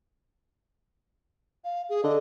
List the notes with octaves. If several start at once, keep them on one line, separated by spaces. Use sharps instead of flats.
F5
G#4
D3 D#5